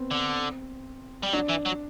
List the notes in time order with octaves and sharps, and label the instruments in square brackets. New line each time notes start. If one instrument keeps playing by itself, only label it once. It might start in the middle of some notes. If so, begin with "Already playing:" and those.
Already playing: [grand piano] B3 C4
[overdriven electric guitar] D3
G3
[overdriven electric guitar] F#3 [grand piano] D4
[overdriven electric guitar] E3
F#3